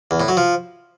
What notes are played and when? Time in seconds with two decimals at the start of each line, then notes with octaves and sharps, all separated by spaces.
0.11 E2
0.20 A2
0.28 F#3
0.37 F3